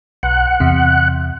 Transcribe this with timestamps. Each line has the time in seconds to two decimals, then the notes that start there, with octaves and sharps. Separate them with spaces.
0.23 B1 F#5
0.60 E2 C3